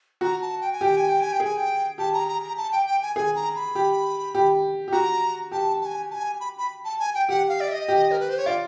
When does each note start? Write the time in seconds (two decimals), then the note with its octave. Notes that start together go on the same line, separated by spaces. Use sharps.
0.21 F#4 A#5
0.42 A5
0.61 G5
0.72 G#5
0.81 G4 G5
0.97 G#5
1.08 G5
1.21 G#5
1.32 G5
1.40 G#4 G#5
1.57 G5
1.98 G4 A5
2.14 A#5
2.28 A#5
2.43 A#5
2.57 A5
2.72 G5
2.86 G5
3.02 G#5
3.16 G#4 G#5
3.36 A#5
3.56 B5
3.75 G4
4.35 G4
4.88 G4
4.93 F#4 A#5
5.51 G4 A5
5.82 A5
5.85 G#5
6.11 A5
6.14 G#5
6.40 B5
6.58 B5
6.85 A5
7.00 G#5
7.14 G5
7.29 G4 F#5
7.49 F5
7.61 D5
7.68 E5
7.73 D#5
7.88 G4
8.11 A#4
8.20 B4
8.29 C5
8.38 C#5
8.46 F4 D5